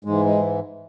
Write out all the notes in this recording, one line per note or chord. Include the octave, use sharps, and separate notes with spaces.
G#2 E3 G#3
G#3